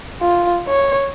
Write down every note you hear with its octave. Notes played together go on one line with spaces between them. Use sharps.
F4
C#5